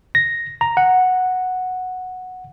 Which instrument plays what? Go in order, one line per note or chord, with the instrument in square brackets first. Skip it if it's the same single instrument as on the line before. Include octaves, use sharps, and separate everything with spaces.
[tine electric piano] A#6
A#5
F#5